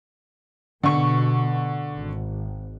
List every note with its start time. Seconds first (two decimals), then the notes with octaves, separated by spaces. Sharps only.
0.84 B2 D3 C#6
1.91 G#1